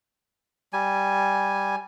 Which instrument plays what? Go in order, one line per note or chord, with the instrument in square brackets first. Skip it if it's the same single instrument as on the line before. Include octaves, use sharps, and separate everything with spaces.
[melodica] G3 G#5